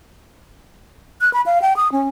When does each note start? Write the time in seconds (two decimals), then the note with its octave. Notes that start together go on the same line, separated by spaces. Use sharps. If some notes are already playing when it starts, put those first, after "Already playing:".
1.21 F#6
1.33 B5
1.46 F5
1.62 G5
1.77 D#6
1.92 C#4